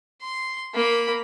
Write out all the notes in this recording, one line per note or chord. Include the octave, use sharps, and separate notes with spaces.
C6
A#3 B5